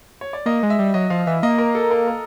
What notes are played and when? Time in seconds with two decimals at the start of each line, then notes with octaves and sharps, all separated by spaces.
0.21 C#5
0.33 D5
0.46 A#3 D#5
0.63 G#3
0.70 E5
0.79 G3
0.94 F#3 D#5
1.10 F3 F5
1.27 E3 E5
1.43 A#3 D#5
1.58 A#4
1.75 A4
1.91 A#4
2.07 A#4